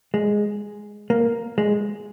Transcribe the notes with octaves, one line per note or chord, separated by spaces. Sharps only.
G#3
A#3
G#3